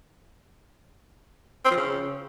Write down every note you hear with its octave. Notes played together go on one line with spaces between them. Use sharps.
C4
F3
C#3